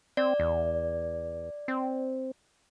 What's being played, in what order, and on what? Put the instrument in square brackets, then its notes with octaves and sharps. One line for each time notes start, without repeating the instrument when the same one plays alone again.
[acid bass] C4 [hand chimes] D5
[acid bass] E2
C4